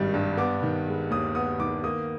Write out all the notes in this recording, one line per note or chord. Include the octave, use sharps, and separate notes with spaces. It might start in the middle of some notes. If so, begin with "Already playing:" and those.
Already playing: G#1 G2 D#3 G3
G2
B3 D6
D#3
G#3
D#2 D#6
B3 D#6
D#3 D6
A#3 D#6